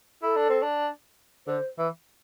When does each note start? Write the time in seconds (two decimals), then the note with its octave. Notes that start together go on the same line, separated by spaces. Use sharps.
0.23 E4 A4
0.36 D4
0.49 C4
0.63 D4
1.47 D3 C5
1.78 E3